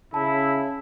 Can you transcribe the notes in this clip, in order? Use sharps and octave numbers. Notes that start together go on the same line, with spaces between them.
C#3 E4 A5